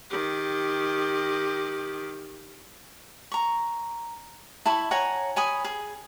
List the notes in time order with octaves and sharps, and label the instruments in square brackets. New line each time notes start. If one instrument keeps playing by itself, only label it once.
[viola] D#3 G4
[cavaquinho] A#5 C#6
E4 A5 B5 C#6
C#5 F#5 G#5 A#5
C#5 G#5 B5 D#6
G#4